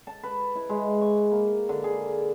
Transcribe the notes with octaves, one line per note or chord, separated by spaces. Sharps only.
A5
B4
E4
G#3
C#6
A#3
D3
G#4